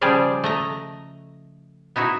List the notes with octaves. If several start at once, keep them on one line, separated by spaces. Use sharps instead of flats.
C#3 F3 G3 G#4 D5 F5
A3 D#5 A#5
B3 D#4 E4 F#4